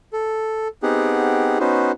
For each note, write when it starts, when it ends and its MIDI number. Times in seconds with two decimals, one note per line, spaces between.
0.13 0.68 69
0.83 1.58 59
0.83 1.58 60
0.83 1.58 63
0.83 1.58 67
0.83 1.58 68
0.83 1.58 78
1.60 1.92 59
1.60 1.92 61
1.60 1.92 63
1.60 1.92 66
1.60 1.92 71
1.60 1.92 72